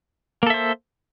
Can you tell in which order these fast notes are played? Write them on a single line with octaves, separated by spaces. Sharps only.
A#3 A4 E5 C5